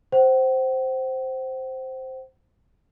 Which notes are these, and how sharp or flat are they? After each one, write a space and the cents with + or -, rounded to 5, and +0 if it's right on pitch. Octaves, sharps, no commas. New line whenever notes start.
C5 +0 F#5 +45